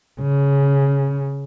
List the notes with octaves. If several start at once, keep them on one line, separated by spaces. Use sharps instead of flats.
C#3